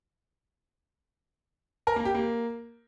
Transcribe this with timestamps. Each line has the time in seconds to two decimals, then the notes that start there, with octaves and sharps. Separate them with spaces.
1.87 A#4
1.96 A#3
2.05 G4
2.15 A#3